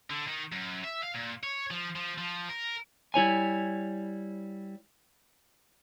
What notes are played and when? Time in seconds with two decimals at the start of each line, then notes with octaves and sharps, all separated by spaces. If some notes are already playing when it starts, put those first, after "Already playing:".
0.10 D3
0.27 D#3
0.52 F#2
0.85 E5
1.03 F5
1.15 A#2
1.43 C#5
1.71 F3
1.96 F3
2.18 F3
2.48 A#4
3.14 G3 E4 C#5 G#5